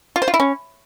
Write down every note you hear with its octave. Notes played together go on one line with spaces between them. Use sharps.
F4
C5
F4
E4
C#4